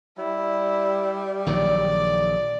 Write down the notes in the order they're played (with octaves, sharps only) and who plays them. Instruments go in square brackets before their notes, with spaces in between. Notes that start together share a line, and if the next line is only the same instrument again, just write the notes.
[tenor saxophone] G3 [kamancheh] E4
[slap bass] A#1 D#3 F#3 [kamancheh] D5